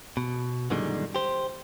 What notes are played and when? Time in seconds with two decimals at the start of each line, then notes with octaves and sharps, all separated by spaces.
0.17 B2
0.70 F#2 A#2 D3 D#3 G3 G#3
1.15 G4 C5